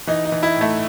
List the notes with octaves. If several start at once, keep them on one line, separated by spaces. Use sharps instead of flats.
E3 D#4
D#4
E3
E4
A2
A3